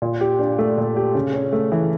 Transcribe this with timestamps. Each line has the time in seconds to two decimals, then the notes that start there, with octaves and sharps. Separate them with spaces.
0.02 A#2
0.21 G4
0.39 D4
0.58 A3
0.78 A#2
0.96 G4
1.15 C#3
1.33 C#4
1.52 A3
1.72 E3